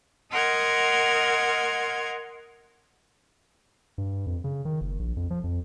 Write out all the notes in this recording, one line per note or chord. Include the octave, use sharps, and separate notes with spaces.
A#4 D#5 F#5 C6 F6 G#6
G2
F2
C#3
D#3
F#1
A#1
F2
F3
F2